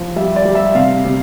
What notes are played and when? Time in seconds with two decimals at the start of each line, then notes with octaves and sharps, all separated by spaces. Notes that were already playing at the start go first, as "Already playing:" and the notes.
Already playing: F3
0.16 G3 E5
0.36 D5
0.45 G3
0.55 E5
0.75 C3 F5
1.05 C3